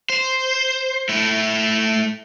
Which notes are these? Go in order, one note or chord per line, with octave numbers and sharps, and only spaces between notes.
C5
A3 E4